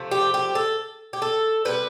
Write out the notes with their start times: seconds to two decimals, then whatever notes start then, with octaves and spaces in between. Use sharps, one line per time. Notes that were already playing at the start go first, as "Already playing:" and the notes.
Already playing: C3 F3 A3
0.11 G4
0.34 G4
0.55 A4
1.13 G4
1.22 A4
1.65 C3 G3 B4